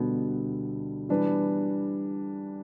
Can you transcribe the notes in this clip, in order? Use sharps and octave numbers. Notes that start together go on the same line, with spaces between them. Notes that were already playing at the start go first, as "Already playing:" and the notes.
Already playing: D2 B2 D3 G3 A4
E3 G3 D4 B4